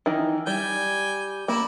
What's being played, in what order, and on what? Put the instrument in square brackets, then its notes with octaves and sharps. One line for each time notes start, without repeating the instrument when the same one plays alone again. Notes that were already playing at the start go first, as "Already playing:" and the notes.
[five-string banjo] D#3 E3
[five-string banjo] G3 [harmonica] G5 G#5
[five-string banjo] A#3 [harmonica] E4 D5